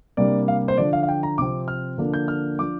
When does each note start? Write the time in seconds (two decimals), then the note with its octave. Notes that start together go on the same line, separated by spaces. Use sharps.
0.17 C3 G3 A#3 D4 D5
0.48 F5
0.68 C5
0.78 D3 F3 D4 D5
0.93 F5
1.03 F5
1.09 G5
1.23 A#5
1.38 C3 F3 C4 D6
1.68 F6
1.98 D3 F3 A#3 D4
2.14 G6
2.28 F6
2.59 F3 D4 D6